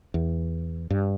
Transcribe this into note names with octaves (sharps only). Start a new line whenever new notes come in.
E2
G2